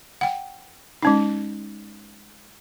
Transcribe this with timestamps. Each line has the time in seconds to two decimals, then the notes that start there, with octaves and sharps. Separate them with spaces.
0.21 F#5 G5
1.02 G#3 C#4 D#4